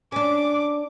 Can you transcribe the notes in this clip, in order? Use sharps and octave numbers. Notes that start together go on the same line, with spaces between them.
C#4 D4 D6